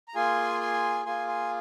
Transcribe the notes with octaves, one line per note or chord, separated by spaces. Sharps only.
A#5
A#3 F4 G#4 G#5 C6
G#5 C6
A#3 F4 G#4 G#5 C6
G#5 C6